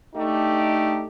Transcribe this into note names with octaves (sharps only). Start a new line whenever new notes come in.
A3 D4 D#4 G4